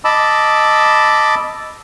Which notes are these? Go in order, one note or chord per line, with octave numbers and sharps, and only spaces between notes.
D#5 A5 B5 D6 E6